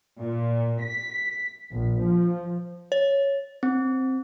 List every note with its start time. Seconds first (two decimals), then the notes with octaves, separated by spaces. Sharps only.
0.20 A#2
0.81 B6
1.70 A#1
2.00 F3
2.92 C#5
3.63 C4